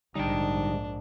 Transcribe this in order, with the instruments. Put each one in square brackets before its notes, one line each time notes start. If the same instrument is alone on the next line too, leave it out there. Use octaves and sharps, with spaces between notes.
[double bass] A#1 G#2 [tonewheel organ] D3 G3 [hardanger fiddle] D4 [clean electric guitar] D#4 G5